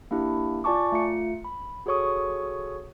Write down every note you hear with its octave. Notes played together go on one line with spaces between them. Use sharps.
A#3 D4 E4 G4
F4 D5 G#5 A5 C#6 D6
A3 F4 C#7
B5
F#4 G#4 A4 C#5 C#6 D#6